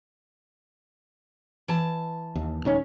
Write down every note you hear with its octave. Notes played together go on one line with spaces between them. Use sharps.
E3 A5
D#2
D#1 D#3 C#4